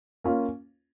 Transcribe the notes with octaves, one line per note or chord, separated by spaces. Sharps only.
A#3 C#4 F4